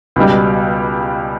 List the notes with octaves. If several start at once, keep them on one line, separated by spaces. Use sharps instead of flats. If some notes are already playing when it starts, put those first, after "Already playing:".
C#2 B2 G3